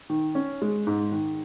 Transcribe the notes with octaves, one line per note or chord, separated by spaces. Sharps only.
D#3
C#4
G#3
G#2
D#3